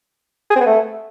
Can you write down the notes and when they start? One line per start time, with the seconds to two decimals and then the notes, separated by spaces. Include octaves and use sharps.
0.50 G#4
0.56 C4
0.61 B3
0.66 A3